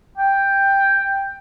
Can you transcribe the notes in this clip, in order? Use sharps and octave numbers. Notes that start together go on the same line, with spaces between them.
G5